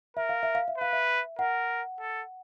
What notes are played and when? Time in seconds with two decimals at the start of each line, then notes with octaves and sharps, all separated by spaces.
0.17 A#4 E5
0.29 F5
0.43 E5
0.55 F5
0.68 E5
0.78 B4 F5
0.93 E5
1.39 A#4 F#5
2.00 A4